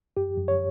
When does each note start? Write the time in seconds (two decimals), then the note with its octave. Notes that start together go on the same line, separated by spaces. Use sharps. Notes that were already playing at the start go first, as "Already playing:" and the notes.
0.17 F#2 G4
0.38 F#2
0.48 C#5